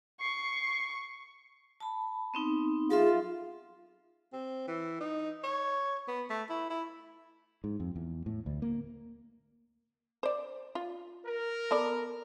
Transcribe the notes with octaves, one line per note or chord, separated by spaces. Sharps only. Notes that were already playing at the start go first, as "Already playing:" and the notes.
C#6 C7
A5 B5
B3 C4 D#4
F#3 F4 G#4 A4 E5
C4
E3
D#4
C#5
B3
A3
E4
E4
G#2
F2
E2
A2
D2
A#3
C5 D5
F4
A#4
B3 A4 D5